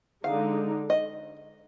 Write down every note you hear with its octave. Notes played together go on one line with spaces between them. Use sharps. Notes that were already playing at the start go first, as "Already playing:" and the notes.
D3 G#3 D#4 F5
D#5